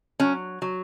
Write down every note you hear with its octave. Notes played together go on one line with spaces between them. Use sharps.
F#3 C#4
F#3